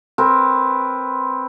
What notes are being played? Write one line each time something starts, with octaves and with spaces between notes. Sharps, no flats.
C4 A#4 B4